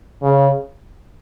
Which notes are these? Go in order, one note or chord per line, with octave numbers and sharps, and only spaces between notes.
C#3